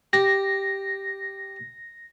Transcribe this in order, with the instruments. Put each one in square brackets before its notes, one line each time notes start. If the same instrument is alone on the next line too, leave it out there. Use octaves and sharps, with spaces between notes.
[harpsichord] G4 [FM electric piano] A#6